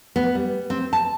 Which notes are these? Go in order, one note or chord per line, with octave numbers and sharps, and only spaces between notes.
B3
G3
C4
A5